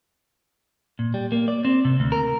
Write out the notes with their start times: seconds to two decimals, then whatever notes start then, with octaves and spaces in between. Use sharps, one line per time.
0.99 A#2
1.14 G3
1.32 A#3
1.48 D5
1.65 C4
1.85 C3
2.00 D2
2.12 A#4